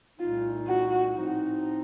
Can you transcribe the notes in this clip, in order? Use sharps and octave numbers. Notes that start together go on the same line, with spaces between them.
C2 A#2 A3 D#4 F4
F#4
A2 F3 C4 D#4